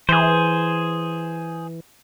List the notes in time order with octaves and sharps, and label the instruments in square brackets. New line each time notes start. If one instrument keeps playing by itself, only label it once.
[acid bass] E3 [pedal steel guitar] G#4 C5